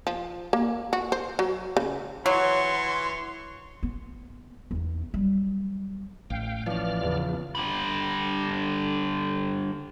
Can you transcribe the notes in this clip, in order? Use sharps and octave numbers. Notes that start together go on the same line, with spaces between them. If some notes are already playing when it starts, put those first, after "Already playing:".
F3
A#3
F#4
C5
F#3
C#3
E3 F#3 C#5 C6
B3
E2 D#4
F#3 G3
A1 F5 G5
E3 F3 C#4 D5 F6
E2 C#3
D3 G3